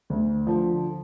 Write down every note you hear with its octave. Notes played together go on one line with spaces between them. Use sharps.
D2
D3 F3